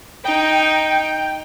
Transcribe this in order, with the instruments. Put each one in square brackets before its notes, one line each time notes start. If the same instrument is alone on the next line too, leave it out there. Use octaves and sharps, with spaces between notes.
[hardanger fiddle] D#4 [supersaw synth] G5